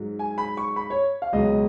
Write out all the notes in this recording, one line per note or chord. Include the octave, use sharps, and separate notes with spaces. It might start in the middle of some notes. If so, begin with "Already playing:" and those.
Already playing: G#2 F#3
G#5
B5
C#6
B5
C#5
F5
C#2 B2 F#3 D#5